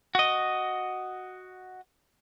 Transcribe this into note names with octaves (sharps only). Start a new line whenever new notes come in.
F#4 D#5